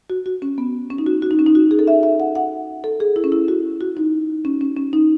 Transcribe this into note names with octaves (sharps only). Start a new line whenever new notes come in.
F#4
F#4
C#4
B3
C#4
D#4
F#4
F#4
D#4
C#4
D#4
F#4
G#4
A4
E5
E5
F#5
F#5
A4
G#4
E4
C#4
E4
F#4
F#4
D#4
C#4
C#4
C#4
D#4